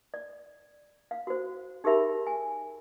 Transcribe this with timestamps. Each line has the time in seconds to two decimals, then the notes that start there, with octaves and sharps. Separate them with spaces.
0.14 D5
1.11 F5
1.27 F#4 C5
1.84 D#4 G4 G#4 A#4 E5 B5
2.27 G#5